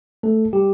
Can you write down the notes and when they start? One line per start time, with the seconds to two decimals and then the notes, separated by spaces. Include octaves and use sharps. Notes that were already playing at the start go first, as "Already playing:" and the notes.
0.23 A3 A4
0.53 G3 G4